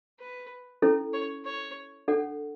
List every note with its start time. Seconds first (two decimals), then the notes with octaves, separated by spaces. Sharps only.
0.19 B4
0.82 C#4 E4 A4
1.13 C#5
1.45 C#5
2.08 D4 A4 C#5 F#5